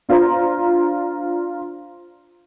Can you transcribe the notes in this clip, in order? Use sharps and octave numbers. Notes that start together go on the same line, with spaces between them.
D4 F4 C5 A#5